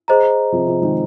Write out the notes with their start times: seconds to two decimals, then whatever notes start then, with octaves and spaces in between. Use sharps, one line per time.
0.08 G#4 C5 D#5 A#5
0.52 C3 F3
0.67 C3 F3
0.82 D#3 G#3